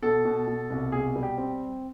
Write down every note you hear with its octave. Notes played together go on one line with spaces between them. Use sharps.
B2 A4
B2
B2
C2
B2 G#4
G3
G4
C4